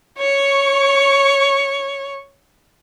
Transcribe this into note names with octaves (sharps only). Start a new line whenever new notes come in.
C#5 C#6